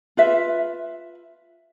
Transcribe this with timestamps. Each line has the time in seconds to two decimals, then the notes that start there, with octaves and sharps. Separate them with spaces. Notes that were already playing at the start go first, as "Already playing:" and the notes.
0.17 F4 B4 E5